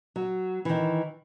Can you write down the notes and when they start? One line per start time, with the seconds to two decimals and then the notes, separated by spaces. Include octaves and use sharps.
0.16 F#3
0.65 D#3 E3